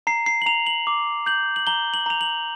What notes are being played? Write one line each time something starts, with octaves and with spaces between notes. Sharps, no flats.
A#5 C7
C7
F#7
A#5 F7
F#7
D6
G6 F#7
F#7
A#5 G7
F#7
A#5 F7
F#7